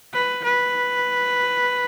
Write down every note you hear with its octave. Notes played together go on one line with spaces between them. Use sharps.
B4
B4